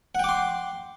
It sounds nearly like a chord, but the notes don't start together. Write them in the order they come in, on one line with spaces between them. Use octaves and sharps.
F#5 G5 D6 C6